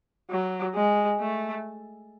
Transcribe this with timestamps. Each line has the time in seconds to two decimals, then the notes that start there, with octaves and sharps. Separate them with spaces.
0.30 F#3
0.75 G#3
1.20 A3